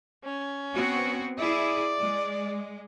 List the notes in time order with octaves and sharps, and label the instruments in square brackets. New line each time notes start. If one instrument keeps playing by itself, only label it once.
[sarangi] C#4
[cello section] B3 C4 F#4
[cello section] E4 G#4 [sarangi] D5
[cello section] G#3